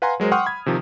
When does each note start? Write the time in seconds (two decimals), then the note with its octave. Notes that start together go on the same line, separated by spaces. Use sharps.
0.02 B4 F5 F#5 G#5 A#5 C6
0.20 F#3 G#3 A#4 C5
0.32 F#5 G5 C6 C#6 D#6 F6
0.46 B5 G#6
0.66 C3 D#3 F3